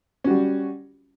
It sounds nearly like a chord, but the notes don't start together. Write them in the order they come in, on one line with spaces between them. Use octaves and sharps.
C#4 F#4 G3